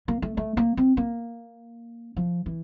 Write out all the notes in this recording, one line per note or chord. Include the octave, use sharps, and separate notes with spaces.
A#3
A3
A3
A#3
C4
A#3
F3
E3